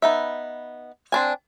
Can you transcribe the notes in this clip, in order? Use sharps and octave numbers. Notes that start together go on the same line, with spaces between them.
B3 D#4 E5
C4 D4 G#5